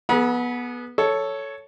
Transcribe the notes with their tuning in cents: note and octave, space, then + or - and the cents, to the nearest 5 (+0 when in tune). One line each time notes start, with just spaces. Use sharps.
B3 -15 G#4 +40 B5 -45
A4 +0 C#5 +5